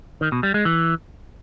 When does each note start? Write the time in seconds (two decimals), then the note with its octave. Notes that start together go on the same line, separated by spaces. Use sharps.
0.21 D#3
0.32 B2
0.43 G3
0.54 G#3
0.65 E3